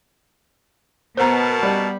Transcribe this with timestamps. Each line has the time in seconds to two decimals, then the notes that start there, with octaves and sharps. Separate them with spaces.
1.17 B2 B3 A#4 C5 A5 A#5
1.63 G3